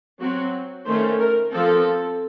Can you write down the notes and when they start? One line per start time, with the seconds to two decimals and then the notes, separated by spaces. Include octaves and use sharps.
0.19 F#3 C4 F#4
0.85 D#3 A3 C#4 C5
1.19 A#4
1.52 F3 C4 A4